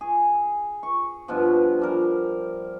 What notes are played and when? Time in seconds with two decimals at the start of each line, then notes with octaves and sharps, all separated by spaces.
0.01 G#4
0.83 C#6
1.28 G2 B2 F3
1.80 F3 G3 A#4